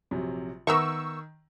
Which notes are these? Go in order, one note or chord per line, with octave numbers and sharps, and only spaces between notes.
A#1 C3 F#3
D#3 B3 A#4 E5 C#6 E6